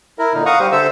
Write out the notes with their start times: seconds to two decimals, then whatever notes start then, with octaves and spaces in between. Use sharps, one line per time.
0.19 E4 A#4
0.34 A#2 D3 D#4
0.46 F5 F#5 A#5 C#6 D#6
0.60 G3 G4 C5
0.72 D3 A4 C5 E5 E6